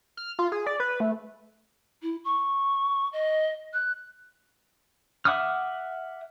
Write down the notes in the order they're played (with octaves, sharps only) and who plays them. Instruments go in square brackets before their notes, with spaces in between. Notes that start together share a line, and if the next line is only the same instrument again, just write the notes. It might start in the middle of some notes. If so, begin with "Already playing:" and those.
[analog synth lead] F6
F4
G#4
D5
B4
A3
[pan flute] E4
C#6
D#5
F#6
[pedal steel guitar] E5 F#5 D6 D#6 F6